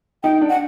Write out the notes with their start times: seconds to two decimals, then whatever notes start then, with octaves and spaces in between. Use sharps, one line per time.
0.23 D#4 G5
0.41 D4
0.50 F#5